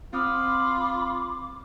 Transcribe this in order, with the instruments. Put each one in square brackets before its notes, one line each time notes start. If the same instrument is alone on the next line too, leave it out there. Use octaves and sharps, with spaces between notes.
[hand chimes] C4 D#6 F6 [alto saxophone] F4 [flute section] B5 C6 [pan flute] D6